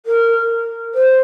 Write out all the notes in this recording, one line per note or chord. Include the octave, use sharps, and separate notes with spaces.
A#4
C5